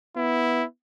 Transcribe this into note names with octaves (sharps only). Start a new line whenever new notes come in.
B3 E4